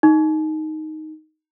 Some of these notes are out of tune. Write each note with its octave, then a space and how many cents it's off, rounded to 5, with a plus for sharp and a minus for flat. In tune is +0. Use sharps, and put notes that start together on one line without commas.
D#4 +5